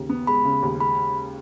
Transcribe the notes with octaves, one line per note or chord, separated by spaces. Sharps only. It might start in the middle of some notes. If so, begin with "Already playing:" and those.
Already playing: D#2 C#3
B3
G#3 B5
C#3
D#2
G#3 B5